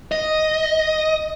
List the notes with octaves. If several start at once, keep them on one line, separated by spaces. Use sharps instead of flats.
D#5